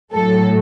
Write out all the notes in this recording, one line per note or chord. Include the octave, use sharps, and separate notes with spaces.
A2 F#3 A3 A4